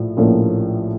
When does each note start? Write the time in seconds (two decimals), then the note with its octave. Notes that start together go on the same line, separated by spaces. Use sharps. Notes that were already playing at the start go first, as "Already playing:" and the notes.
Already playing: A#1 A2 F3
0.17 A#1 A2 F3 A#3 C#4